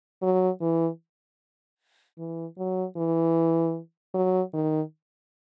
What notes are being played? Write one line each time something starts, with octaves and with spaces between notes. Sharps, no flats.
F#3
E3
E3
F#3
E3
F#3
D#3